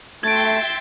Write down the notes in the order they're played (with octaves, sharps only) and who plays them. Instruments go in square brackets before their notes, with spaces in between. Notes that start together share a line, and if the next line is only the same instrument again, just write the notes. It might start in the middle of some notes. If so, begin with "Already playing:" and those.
[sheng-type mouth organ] A3 [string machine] E5 G5 C6 [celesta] G#6 D7 [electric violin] A6